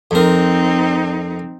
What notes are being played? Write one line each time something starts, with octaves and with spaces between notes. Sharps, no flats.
F2 C4 D#4 A#4